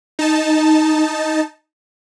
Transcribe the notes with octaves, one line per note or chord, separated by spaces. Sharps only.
D#4 A5